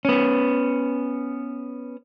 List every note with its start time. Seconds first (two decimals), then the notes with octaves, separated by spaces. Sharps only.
0.05 B3 C#4